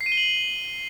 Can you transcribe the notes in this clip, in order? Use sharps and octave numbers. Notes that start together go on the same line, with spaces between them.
C7
D#7
G7
F#7